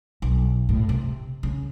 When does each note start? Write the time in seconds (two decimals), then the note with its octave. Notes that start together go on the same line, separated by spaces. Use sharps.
0.22 B1
0.69 A2
0.89 C3
1.43 C#3